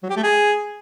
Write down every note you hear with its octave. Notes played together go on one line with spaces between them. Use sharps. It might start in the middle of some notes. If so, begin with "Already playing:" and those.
F#3
G4
A3
G#4